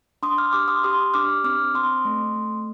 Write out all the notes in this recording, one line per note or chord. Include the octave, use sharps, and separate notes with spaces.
D4 C6 D#6
D6 F6
G4 D6 F6
C6 D#6
G4 C6 D#6
D4 D6 F6
C4 D6 F6
C4 C6 D#6
A3
A3